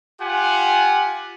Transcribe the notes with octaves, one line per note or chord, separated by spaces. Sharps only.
F4 G4 F#5 G#5